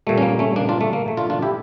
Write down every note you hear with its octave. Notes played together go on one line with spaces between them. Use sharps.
A#2 G3 A3
C#4
A#3
A3 C#4
A#3 D4
D4 F4
A3
A#3
A#2 A3
D4 F4
D4 F4
E4 G4